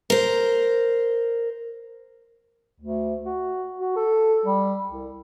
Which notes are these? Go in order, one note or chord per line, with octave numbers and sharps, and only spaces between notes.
A#4 C5
D2
F#4
F#4
A4
G3
C2